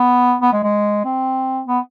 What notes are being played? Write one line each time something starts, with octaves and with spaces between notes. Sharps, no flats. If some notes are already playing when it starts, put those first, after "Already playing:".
Already playing: B3
B3
G#3
G#3
C4
B3